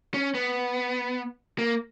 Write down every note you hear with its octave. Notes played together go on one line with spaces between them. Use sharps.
C#4
B3
A#3